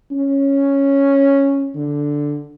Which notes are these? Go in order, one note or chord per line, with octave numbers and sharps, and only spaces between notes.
C#4
D3